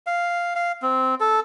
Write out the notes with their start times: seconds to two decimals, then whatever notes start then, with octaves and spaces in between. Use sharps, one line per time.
0.07 F5
0.55 F5
0.82 C4
1.20 A4